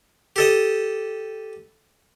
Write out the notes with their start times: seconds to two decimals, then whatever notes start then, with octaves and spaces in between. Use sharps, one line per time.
0.36 G4 A4 D#5